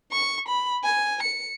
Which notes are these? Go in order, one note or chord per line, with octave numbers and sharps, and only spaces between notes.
C#6
B5
G#5
C#7